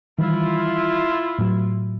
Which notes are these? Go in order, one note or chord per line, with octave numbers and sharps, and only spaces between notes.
D#3 E3 G3 E4 F4
A2 F#3